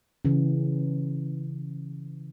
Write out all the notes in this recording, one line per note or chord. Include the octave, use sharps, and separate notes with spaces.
C#3 E3